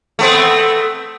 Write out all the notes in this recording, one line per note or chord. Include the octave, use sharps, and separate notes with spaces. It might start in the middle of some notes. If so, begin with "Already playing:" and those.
A3 B3 C4